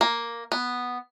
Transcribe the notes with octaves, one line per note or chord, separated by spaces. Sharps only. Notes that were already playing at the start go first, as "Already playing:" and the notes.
A#3
B3